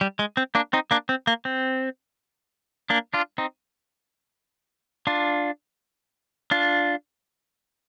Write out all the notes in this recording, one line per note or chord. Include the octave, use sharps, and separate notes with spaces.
G3
G#3
C4
A#3 D4
C4 D#4
A#3 D4
C4
A#3
C4
A#3 D4
D4 F4
C4 D#4
D4 F4
D4 F4